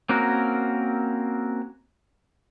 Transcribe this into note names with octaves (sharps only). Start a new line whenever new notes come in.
A#3 C4 C#4 F#4 A#4